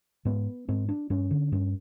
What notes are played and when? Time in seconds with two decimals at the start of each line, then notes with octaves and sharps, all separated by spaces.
0.25 G#2 B3
0.69 G#2 C4
0.89 D4
1.10 G2 C#4
1.31 D3
1.52 G2 C#4